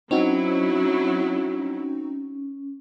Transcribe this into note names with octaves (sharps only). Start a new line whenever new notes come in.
F#3 C4 C#4 D#4 E4 F#4